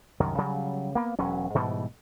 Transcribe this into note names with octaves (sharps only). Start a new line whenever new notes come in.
C2 F#2 D#3
C#3 F#3 G3
A#3 B3
E1 F#3 C#4
G#2 B2 E3 G3